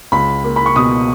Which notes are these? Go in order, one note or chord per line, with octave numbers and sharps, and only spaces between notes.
C#2 B5
A#3
B5
C#6
B2 D#6